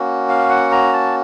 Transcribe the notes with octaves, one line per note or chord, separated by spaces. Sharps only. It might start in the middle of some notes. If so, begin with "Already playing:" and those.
Already playing: A#3 C#4 F#4
F5
F#5
A#5
A5